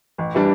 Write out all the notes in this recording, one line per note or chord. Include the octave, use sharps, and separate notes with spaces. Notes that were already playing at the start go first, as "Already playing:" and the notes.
A1
E3 G3 D4